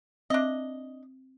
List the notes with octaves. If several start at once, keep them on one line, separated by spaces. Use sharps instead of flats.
C4 D4 D#5 E5 A#6